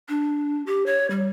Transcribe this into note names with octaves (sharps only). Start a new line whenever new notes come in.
D4
G4
C#5
G3